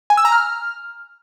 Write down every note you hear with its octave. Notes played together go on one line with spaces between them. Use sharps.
G#5
E6
A#5
F6